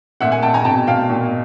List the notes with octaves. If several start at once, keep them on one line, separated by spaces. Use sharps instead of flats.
A#2 E5 F#5
F#5 G#5
A#2 G5 A5
G#5 A#5
B2 G5 A5
B2 F5 G5
A#2